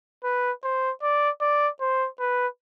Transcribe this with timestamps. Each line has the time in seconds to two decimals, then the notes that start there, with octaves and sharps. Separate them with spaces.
0.24 B4
0.64 C5
1.03 D5
1.41 D5
1.81 C5
2.20 B4